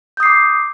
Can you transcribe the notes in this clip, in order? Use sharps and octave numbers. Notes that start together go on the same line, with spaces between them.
D6 D#6 G6 C7